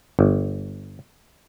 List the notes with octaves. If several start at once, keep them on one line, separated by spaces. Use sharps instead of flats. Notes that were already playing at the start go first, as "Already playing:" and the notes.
G1